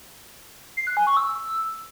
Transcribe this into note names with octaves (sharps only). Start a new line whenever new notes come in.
C7
F#6
G#5
C#6
E6